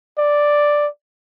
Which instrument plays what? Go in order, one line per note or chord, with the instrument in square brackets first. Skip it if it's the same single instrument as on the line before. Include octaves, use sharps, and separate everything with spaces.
[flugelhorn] D5